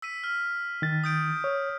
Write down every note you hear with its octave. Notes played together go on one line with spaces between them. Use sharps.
E6 B6 D#7
F6
D#3 A6
D#6 G6 D7
C#5